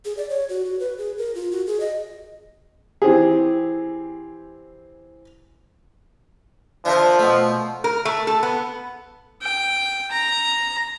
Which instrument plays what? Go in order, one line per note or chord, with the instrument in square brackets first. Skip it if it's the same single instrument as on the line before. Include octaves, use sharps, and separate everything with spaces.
[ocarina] G#4
D5
C#5
F#4
F#4
B4
G#4
A#4
F4
F#4
G#4
D#5
[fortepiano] E3 C4 G4 G#4
[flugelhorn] F3 [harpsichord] D4 E4 A#4
[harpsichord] B2 A3
[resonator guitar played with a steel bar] A#4
A3
A4
B3
[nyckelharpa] G5
A#5